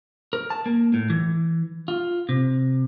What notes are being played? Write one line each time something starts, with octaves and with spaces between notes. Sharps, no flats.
A#4
A5
A#3
A2
E3
F4
C3